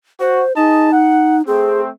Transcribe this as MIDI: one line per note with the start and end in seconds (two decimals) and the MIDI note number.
0.20 0.42 66
0.20 0.52 72
0.56 1.42 63
0.56 0.90 68
0.56 0.90 75
0.56 0.90 81
0.91 1.36 78
1.47 1.89 57
1.47 1.89 60
1.47 1.81 68